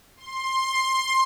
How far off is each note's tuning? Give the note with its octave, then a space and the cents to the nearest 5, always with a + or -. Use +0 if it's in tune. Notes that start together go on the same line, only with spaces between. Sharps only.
C6 +15